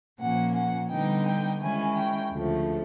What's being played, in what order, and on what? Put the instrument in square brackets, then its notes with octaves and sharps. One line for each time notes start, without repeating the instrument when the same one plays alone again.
[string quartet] A#2 F3 A#3 C#4 F#5
F#5
D3 G3 B3 D#4 G5
G5
D#3 G#3 C#4 E4 G#5
G5
D2 C#3 F3 A3